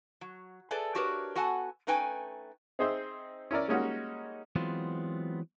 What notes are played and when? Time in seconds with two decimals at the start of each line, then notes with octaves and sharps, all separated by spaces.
0.21 F#3
0.71 G#4 A4 B4 D5 E5
0.95 D4 F#4 G4 A#4 B4 C#5
1.35 B3 F#4 A4 F#5 G#5 A5
1.87 A3 C#4 D#4 B4 G5 G#5
2.79 C4 D#4 G#4 C5 D#5 E5
3.51 C#4 E4 A#4 D5
3.68 G3 G#3 A#3 C#4 D#4 F#4
4.56 E3 F#3 G#3 B3 C4 F4